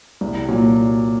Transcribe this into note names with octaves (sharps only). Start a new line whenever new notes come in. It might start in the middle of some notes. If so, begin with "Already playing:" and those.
C2
A#2 F#3